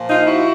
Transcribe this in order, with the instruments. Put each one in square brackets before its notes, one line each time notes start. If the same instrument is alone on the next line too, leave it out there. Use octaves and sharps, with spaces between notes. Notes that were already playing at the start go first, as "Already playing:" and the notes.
Already playing: [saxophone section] A#2 F3
D#4 F4
E4 F#4